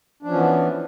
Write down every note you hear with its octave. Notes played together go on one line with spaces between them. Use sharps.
E3 F3 B3 C#4 D4